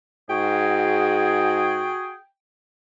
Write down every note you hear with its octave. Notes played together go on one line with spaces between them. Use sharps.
G#2 F#4 G#4 G5